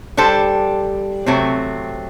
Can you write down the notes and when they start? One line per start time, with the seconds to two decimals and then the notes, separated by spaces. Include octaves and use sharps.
0.17 G3 D4 A4 C5
1.26 C3 F#3 A3 C4